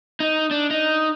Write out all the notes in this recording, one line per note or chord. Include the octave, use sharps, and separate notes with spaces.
D#4
D4
D#4